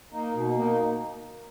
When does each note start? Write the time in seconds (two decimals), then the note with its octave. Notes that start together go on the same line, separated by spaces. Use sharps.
0.12 A#3 D#4
0.34 B2
0.55 A#3 D#4